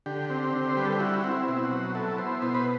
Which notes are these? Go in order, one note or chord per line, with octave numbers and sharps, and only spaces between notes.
D3 G4
C4
D3
C5
G3 B4
A4
G4
E4 F#4
C4
E4
B2
F#4
F#3
E4 A4
B3 C5
B2 C5
B4